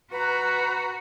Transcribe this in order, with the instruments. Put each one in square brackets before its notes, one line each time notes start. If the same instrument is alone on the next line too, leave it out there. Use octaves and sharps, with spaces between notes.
[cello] F#4 [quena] B4 [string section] A#5